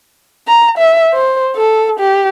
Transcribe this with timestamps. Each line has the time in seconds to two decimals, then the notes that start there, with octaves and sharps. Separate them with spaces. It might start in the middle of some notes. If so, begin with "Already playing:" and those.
0.48 A#5
0.78 E5
1.14 C5
1.56 A4
2.00 G4